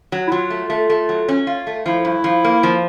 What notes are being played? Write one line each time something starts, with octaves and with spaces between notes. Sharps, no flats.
F#3
E4
F#3 F4
A3
A3
A3
F#3
C#4
F4
A3
F3 E4
G2
F3
A#3
F3